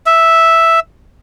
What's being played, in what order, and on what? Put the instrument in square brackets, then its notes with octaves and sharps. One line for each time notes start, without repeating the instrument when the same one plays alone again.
[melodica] E5